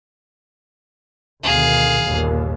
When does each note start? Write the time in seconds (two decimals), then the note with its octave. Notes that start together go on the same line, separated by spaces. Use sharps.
1.43 D2 B2 D#3 G#4 F5
2.02 G1 D#2 A#2